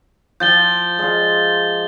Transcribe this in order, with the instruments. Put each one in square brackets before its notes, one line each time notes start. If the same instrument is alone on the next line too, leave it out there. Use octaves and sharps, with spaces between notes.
[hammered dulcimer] F3 G5 [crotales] G6 A6 G7
[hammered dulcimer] G#3 F5